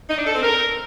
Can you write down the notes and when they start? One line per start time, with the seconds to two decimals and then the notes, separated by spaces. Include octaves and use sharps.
0.10 D#4
0.18 D4
0.27 A4
0.35 C4
0.43 A#4